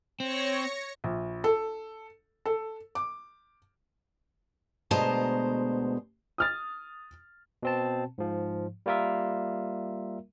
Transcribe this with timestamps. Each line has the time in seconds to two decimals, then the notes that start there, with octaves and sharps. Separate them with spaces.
0.20 C4 C#5 A#6 C#7
1.04 A#1
1.44 A4
2.46 A4
2.95 D6
4.91 D2 B2 G#3 C5 A5 A#5
6.38 D#6 F6 A6
7.63 B2 C4 A5
8.18 G#2 F3
8.86 G3 A#3 F4 A#4 E5